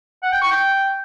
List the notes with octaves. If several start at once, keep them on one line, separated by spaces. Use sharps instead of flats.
F#5
G5
C#6
G5